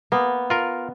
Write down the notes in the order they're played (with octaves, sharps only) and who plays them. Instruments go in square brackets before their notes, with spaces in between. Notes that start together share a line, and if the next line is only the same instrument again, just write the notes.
[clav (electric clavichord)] A#3 [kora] B3
[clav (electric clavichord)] F4 A#4